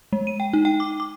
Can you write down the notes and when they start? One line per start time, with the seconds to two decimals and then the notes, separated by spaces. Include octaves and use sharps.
0.13 G#3
0.27 D#7
0.40 G5
0.53 D#4
0.65 G5
0.80 D6
1.00 D6